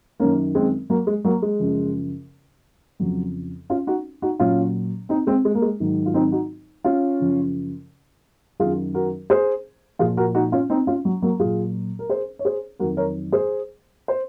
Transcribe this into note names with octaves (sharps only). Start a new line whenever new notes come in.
F#2 D#3 F#3 A#3 C#4
G#3 C4
F#3 A#3
G#3
F#3 A#3
G#3
F#2 C#3 F3
F2 C#3 F3 F#3
C#4 F4
D#4 F#4
D#4 F#4
A#2 F#3 C#4 F4
C4 D#4
G#3 C4
G#3
A#3
G#3
G#2 D#3 F#3
F4
C4 D#4
D#4 F#4
C#4 F4
F#2 C#3 F3
F#2 D#3 F#3 F4 G#4
F#4 A#4
G#4 C5
A#2 F3 F4 G#4
F#4 A#4
D#4 F#4
C#4 F4
C4 D#4
C#4 F4
F#3
F#3 A#3
A#2 F#3 F4 G#4
A#4
G#4 C5
C#5
G#4 C5
F2 D#3 F#3 F#4 A#4
A#4 C#5
G#4 C5
C5